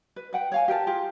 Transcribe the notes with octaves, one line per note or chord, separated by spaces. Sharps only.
B4
B4 F#5 G5
C#5 F5 G#5
G4 A#4 G5 A5
F4 G4 G#4